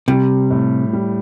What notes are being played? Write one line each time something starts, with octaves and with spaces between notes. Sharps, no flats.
C3 G3
A2
G3